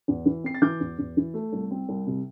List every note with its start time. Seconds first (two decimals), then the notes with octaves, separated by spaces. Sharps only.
0.08 E2
0.26 E3
0.44 C4 C7
0.54 A6
0.62 E3 D6 G6
0.80 E2
0.99 E2
1.17 E3
1.34 A3
1.52 C2
1.71 C4
1.89 C2
2.07 C3